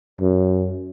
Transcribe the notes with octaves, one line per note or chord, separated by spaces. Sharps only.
F#2